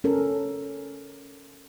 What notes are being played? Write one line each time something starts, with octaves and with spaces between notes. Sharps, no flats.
C#4 A4 A#4